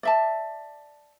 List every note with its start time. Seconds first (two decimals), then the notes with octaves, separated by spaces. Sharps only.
0.03 D5 E5 A5